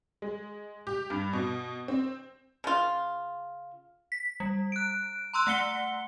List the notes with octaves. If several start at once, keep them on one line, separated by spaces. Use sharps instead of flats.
G#3
G4
G2
B2
C4
C#3 F4
B6
G3
F#6 D7
A#5 C6 E6 F#6
A3 F#5 C#7 G7